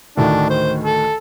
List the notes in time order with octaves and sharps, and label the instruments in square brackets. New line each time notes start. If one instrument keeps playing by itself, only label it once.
[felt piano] D2 A2 D#3 [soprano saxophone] D4
[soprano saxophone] C5
A4